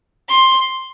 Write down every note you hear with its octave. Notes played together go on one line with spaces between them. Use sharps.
C6